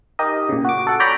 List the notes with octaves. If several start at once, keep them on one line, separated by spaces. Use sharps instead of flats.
D#4 G4 A#4 D#5
A#2 C#3
F#4 D6
A4 F#5
C#5 D5 G5 A#5 B5